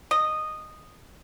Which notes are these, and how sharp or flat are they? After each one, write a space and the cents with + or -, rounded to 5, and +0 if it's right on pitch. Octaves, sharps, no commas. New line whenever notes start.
D#5 -10